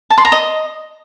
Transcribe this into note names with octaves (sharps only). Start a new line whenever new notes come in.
A5
C6
A#5
D#5